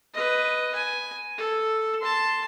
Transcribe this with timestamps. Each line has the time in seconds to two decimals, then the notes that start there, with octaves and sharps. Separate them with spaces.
0.14 B4 D#5
0.75 G#5
1.38 A4
2.01 A5 C6